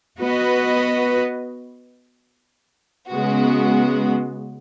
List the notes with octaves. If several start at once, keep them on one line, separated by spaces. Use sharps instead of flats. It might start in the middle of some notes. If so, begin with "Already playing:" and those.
B3 F#4 B4 D#5
C#3 G#3 B3 F#4